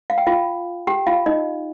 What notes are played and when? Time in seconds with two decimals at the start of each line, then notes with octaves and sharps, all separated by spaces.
0.10 F5
0.18 G5
0.27 F4 F5
0.87 G4 G5
1.07 F4 F5
1.26 D#4 D#5